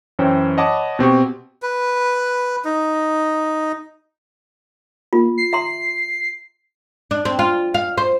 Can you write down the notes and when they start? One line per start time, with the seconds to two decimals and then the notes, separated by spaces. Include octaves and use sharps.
0.19 F#2 E3 C#4 E4 C5 G5
0.57 C#5 D#5 F#5 A5 B5 D6
0.99 B2 C4 G4 C#6
1.62 B4
2.65 D#4
5.13 A#3 F4
5.38 C7
5.53 E5 A#5 C6
7.11 D4
7.25 C4
7.39 F4
7.74 F5
7.98 C5